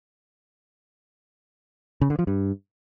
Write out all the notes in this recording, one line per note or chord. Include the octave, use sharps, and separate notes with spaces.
C#3
D3
F3
G2